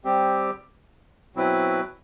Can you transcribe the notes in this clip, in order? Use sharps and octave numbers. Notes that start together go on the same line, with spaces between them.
G3 C4 G4
B2 F#3 C4 E4 B4